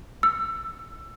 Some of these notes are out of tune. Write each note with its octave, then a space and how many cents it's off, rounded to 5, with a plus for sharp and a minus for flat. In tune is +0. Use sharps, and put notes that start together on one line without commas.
E6 +20